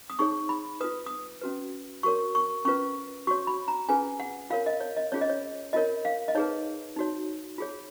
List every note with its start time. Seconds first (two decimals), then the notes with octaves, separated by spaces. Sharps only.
0.10 D#6
0.19 D#4 G#4 C#5 C#6
0.49 B5
0.81 F4 B4 D#6
1.06 D#6
1.42 C#4 F#4 B4
2.03 F#4 A#4 C#5 C#6
2.35 C#6
2.65 C#4 F4 B4 C#6
3.27 F#4 C#5 C#6
3.47 B5
3.68 A#5
3.89 C#4 F4 G#4 B4 G#5
4.20 F#5
4.50 F4 A#4 C#5 F5
4.66 D#5
4.81 C#5
4.96 D#5
5.12 C#4 F4 G#4 C#5
5.21 D#5
5.30 C#5
5.73 F4 A#4 C#5 D#5
6.05 F5
6.28 D#5
6.35 D#4 G#4 B4 C#5
6.97 D#4 F#4 C#5
7.58 F4 G#4 C#5